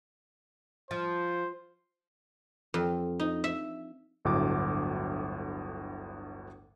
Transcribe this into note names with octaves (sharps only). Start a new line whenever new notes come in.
F3 C5
F2
D#4
E5
G1 D2 A2 F#3 D6